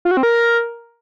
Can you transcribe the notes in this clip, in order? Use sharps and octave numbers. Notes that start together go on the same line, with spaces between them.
F4
F#4
C4
A#4